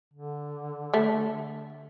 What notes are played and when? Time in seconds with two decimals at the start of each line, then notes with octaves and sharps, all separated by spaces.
0.14 D3
0.94 A3